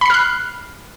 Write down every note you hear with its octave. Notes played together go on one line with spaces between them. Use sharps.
B5 F6 F#6 C7